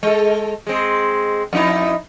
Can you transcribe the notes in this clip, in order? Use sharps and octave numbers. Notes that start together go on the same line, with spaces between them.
G#3 A4
G#3 C4
F2 D#4 E4